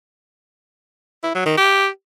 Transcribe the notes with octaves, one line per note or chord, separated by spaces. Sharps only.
E4
F#3
D#3
G4